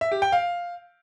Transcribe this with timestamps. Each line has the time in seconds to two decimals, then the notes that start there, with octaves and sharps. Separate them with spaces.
0.01 E5
0.12 G4
0.22 G5
0.32 F5